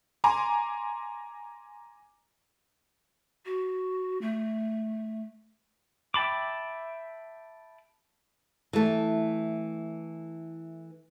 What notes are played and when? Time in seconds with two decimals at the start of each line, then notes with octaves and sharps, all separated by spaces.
0.24 G#5 A#5 C6 D6
3.46 F#4
4.21 A3
6.14 E5 G5 A5 B5 D6
8.73 E3 A3